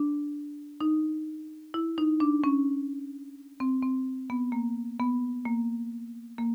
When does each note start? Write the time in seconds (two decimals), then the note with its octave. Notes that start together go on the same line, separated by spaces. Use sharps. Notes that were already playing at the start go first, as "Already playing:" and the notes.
Already playing: D4
0.81 D#4
1.74 E4
1.98 D#4
2.20 D4
2.44 C#4
3.60 C4
3.82 C4
4.30 B3
4.52 A#3
5.00 B3
5.45 A#3
6.38 A#3